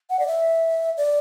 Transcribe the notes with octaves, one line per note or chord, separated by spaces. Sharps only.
F#5
D5
E5
D5